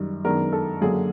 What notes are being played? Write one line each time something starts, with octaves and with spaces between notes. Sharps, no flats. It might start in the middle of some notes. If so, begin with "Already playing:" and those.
Already playing: F#2 D#3 G3
F#2 D#3 G#3 B3 D4 A#4
A4
F#2 D3 F#3 A#3 G#4